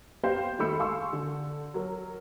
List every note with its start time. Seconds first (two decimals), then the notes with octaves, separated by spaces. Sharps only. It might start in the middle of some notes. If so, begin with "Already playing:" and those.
0.23 B3 G4 C5 F5 G6 C7
0.59 D#3 G#3 A3 B5 E6 C#7
0.79 F5 G#5 C6 C#6 E6
1.13 D3
1.74 F#3 A#4